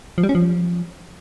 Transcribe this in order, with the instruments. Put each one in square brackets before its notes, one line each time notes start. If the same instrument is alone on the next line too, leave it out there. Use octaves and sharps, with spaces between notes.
[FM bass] F3
G3
C#4
F3